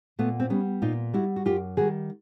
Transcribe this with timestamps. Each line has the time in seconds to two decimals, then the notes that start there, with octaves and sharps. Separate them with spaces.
0.19 A#2 A3 B3
0.40 C4
0.50 G3 B3 C#4
0.82 A#2 D#4 F4
1.13 G3 E4 F#4
1.36 F#4
1.45 F#2 F4 G4
1.77 D#3 G3 F#4 G#4